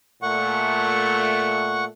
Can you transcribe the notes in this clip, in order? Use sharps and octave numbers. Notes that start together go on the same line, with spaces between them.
A#2 A3 F#5 C#6